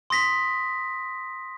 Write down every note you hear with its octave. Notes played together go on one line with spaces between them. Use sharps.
C6 D#6 A#6 B6